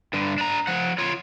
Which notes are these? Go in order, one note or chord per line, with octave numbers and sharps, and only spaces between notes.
G2 D3
D4 A#5
F3 F#5
F4 C#5